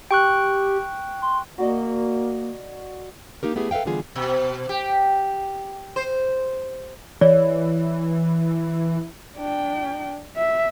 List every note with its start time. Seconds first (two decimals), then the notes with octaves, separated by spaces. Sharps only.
0.11 G4 G5 C#6 F#6
1.22 C6
1.58 A#3 F#4 D5 D#5
3.43 A#3 D#4 G4 A#4
3.55 A3 B3 E4 G4 G#4
3.71 A4 B4 E5 F5 G5
3.86 D3 E3 G3 B3 F4 G#4
4.15 B2
4.69 G4
5.96 C5
7.21 E3 G#4 C#5 D5
9.37 D4 G5
10.36 E5